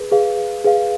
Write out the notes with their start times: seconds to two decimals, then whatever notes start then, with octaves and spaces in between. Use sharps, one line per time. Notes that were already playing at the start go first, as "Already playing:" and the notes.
Already playing: G#4 B4
0.12 G#4 B4 F5
0.64 G#4 B4 F5